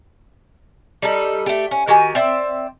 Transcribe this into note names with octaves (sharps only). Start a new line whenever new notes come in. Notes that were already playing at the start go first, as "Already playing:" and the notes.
G3 D#4 A4
A3 G4
C#4
D#3 F#4 G4 G#5
C4 D5 E5